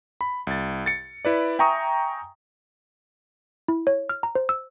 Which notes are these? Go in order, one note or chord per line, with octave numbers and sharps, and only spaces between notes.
B5
C2 A6
A6 C#7
E4 B4 D5
E5 G5 G#5 A#5 C#6 D#6
E4
C#5
F6
A#5
C5
E6